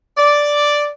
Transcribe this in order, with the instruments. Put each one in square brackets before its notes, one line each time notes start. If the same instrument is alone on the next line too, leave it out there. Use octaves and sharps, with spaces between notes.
[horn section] D5